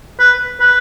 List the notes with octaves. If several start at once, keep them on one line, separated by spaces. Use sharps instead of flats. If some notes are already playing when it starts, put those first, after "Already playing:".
B4
B4